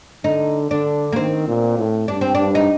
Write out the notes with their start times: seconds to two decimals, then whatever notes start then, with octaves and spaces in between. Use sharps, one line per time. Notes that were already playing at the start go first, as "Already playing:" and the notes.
0.24 D3 D#4
0.71 D3 D4
1.12 A#3
1.16 D#3 C4
1.48 A#2
1.78 A2
2.08 G2 D4
2.21 C4
2.35 G2 D4
2.55 D#4